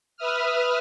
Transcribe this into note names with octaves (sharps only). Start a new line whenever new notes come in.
B4 E5 D#6 F6